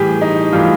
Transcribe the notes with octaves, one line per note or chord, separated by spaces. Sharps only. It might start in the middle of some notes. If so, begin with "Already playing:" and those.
Already playing: A2 E3 G3 G4 G#4
D#4
A2 E3 G3 F4